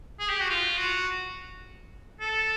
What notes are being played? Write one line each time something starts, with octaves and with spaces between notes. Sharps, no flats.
G#4
G4
F#4
F4
F#4
A4